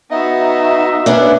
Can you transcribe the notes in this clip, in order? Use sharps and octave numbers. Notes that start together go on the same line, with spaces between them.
B3 D#4 F#4 D#5 E5
B3 C#4 D4